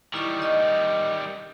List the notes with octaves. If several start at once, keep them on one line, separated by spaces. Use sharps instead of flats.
D#3 G3 E4 C#6
D#5